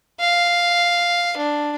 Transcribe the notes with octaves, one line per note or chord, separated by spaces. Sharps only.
F5
D4